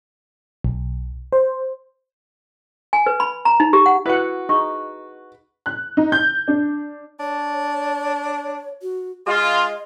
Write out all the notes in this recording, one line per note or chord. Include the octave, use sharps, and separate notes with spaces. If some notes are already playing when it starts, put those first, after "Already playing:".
B1
C5
G#5
B4
B5
A#5
D#4
G4
F#5
E4 F#4 B4 F#5
D#4 G#4 C#6
F#6
D#4
G6
D4
D4 C#5
F#4
G#3 F4 D#5